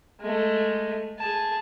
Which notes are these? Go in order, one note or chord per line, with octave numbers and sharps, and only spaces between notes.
G#3 A3
G#4 A5